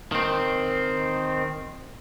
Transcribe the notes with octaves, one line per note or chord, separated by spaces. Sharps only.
D#3 C4